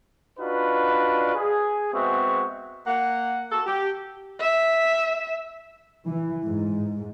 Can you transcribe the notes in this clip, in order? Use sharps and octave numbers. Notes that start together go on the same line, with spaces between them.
D4 D#4 F4 F#4 B4
G#4
G#3 B3 C4 F#4 E5 C#6
A#3 F#5
A#3 F#4 A4
G4
E5
E3
G#2